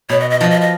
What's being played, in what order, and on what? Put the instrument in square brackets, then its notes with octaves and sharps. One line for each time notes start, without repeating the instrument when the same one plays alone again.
[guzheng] B2 [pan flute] C#5
[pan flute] D#5
D#5
[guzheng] F3 [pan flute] D#5
[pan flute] D#5
D#5